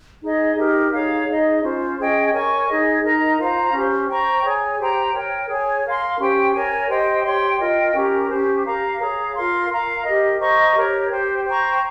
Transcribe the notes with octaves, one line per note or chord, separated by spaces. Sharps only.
D#4 G#4 D#5
D#4 G4 A#4
D#4 G#4 C#5 F5
D#4 G#4 D#5
C#4 F4 C5
C#4 G#4 D#5 G5
A#4 C#5 G#5 C#6
D#4 G#4 D#5
D#4 A#4 D#5 A#5
F4 C5 F5 A#5
C#4 G4 C5
C5 G5 A#5 C#6
G#4 C#5 G#5
G4 C5 G5 A#5
A#4 C#5 G5
G#4 C#5 G#5
A#4 F5 C6
C#4 G4 C5 G5
A#4 C#5 G#5
G4 C5 D#5 G5
G4 C#5 G5 C6
F4 A#4 D#5 G5
C#4 G4 A#4
C#4 G4 C5
G4 A#4 F5 A#5
G#4 C#5 F5 A#5
F4 A#4 F5 C6
A#4 F5 A#5
G4 A#4 D#5
C5 D#5 A#5 C#6
G4 A#4 C#5
G4 C5 G5
C5 G5 A#5 C#6